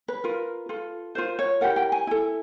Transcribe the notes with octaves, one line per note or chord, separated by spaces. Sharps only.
B4
F4 A#4
F4 A4
F4 A#4 C5
C#5
E4 G4 A#4 F#5
G5
G#5
E4 A4